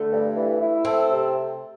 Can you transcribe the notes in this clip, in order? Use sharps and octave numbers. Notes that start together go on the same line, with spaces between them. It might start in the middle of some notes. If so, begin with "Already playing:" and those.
Already playing: D3 A3
G2
E3
E4
C4 A4
C3